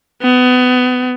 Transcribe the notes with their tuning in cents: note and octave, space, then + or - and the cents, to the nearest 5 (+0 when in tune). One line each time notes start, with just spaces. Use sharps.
B3 +25